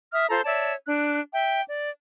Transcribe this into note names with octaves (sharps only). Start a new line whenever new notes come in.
E5 D#6 F6
F4 A4 C5 A#5
C#5 D5 E5 A5
D4 F#6
E5 G5
D5